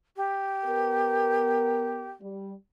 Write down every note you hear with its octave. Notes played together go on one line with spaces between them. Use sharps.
G4
B3 A#4
G3